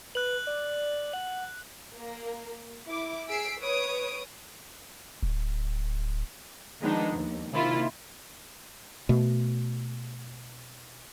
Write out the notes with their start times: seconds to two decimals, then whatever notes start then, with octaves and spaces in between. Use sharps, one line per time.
0.15 B4 F#6 F#7
0.47 D5
1.13 F#5 F#7
1.94 A#3
2.86 E4 D6
3.29 G#4 E6 B6 C7 D7
3.59 B4 C#5 D#6 D7
5.23 D1
6.81 D#3 F3 G#3 B3 D4 D#4
7.14 D#2
7.52 C3 D#3 A#3 E4 F4
9.09 B2 A3